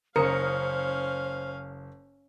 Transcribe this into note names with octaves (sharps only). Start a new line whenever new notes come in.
F#1 C#4 A#4 C5 F5 D#6 C#7